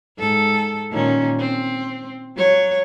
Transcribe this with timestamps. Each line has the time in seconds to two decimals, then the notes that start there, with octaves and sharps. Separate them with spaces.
0.18 G#2 A4
0.91 A#2 D#3 C#4
1.39 C4
2.36 F#3 C#5